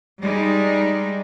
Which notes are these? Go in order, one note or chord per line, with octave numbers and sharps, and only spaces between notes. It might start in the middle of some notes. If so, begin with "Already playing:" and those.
G3 G#3 D#4